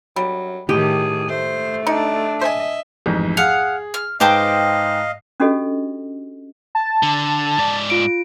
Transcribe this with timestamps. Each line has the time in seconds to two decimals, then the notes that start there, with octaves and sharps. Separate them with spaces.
0.16 F#3 G3
0.69 A2 D#3 G4 G#4
1.29 A3 C5
1.87 D4 D#4
2.41 C5 D#5 E5 G#5
3.06 A1 F2 G#2
3.37 G#4 F5 F#5
3.94 F6
4.20 G#2 B4 C5 D#5 F5 G5 A5 D6
5.40 C#4 D4 F#4 G4 A4 D#5
6.75 A5
7.03 D3
7.58 G#2 D5
7.90 F4 D7